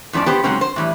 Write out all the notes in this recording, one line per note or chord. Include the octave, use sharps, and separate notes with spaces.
F2 A2 F3 C#4 D5
B3 G4 C5
G#2 C#3 F#3 G#3 C4 C#4
C5
A2 E3 G3